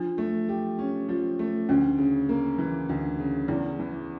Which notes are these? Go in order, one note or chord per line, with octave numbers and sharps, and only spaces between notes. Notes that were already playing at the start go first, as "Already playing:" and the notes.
Already playing: F3 D4
A3
G4
C#4
F3
A3
D2 C#4
C#3
A#3
E3
D2
C#3
E2 E4
E3